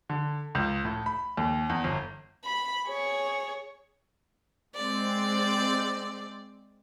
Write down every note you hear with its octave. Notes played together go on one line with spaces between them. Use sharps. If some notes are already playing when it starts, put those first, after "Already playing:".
D3
C#2
A2
B5
D#2
E2
G1
B5
G#4 C#5
G#3 C4 D5